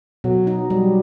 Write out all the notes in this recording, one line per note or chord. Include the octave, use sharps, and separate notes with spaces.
B2 F#3
D#4
F#3 G3